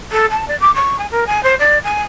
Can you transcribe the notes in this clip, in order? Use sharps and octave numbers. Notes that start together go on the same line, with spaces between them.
A4
A5
D5
D6
C#6
G#5
A#4
G#5
C5
D5
G#5